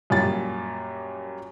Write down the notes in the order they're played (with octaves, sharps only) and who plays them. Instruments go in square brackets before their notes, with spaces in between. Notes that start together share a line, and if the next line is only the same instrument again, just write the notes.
[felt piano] F#2 A#2 G3 A6